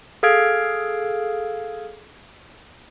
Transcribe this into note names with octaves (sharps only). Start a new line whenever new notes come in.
G#4 A4 F5 F6 G#6 D7